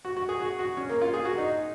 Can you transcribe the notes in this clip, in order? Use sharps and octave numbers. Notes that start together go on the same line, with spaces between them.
F#4
F#4
G#4
F#4
F#4
C#4
A#3
F4
G#4
F#4
D#4